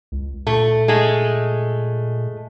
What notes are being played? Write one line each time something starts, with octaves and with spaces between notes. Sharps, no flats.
C#2
A#2 A3
G#3 A3